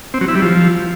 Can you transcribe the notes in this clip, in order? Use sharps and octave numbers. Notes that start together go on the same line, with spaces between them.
C4
F#3
E4
G3
F3